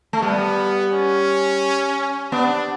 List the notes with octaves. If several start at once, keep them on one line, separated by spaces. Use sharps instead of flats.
A3
G3 B3
C#4
B3 D4